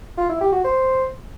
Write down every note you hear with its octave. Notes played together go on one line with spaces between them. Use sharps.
F4
E4
G4
F#4
C5